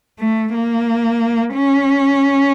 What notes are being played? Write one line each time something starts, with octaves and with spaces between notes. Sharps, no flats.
A3
A#3
C#4